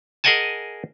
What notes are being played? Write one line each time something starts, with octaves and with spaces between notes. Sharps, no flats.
G#4 A#4 D#5 F#5 G#5 A5